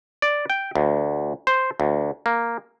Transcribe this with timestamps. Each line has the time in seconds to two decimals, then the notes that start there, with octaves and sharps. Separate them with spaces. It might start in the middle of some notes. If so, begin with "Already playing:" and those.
0.22 D5
0.50 G5
0.75 D2
1.47 C5
1.80 D2
2.26 A#3